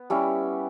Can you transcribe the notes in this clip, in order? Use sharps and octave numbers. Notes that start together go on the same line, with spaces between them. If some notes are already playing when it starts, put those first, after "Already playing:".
Already playing: B3
G3 C#4 E4